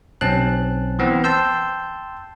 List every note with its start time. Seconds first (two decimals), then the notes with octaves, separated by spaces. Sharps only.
0.21 B1 C4 C#4 A5 F#6
0.99 E3 B3 C4
1.24 G5 A5 C6 E6 G6